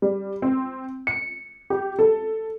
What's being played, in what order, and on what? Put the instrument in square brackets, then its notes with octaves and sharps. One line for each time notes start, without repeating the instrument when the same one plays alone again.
[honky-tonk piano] G3
C4
C#7
G4
A4